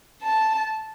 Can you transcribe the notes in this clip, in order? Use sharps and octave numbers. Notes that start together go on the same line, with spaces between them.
A5